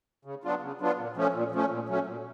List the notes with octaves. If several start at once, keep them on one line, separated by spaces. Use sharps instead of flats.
C#3
F#3 B3 D4 F4
C#3
F#3 B3 D4 F4
A#2
F3 A3 C#4
A#2
F3 A3 C#4
A#2
F#3 A3 C#4
A#2